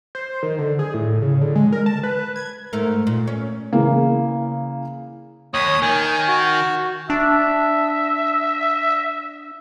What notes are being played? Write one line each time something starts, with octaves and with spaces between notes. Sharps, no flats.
C5
D#3
D3
G#4
A2
C#3
D3
G#3
A#4
A5
B4
G#6
G#2 A3 A#4
A#2
C#4
C#3 E3 A#3
D#2 C#5 D#6
D#3 G#5
F#4
D4 E5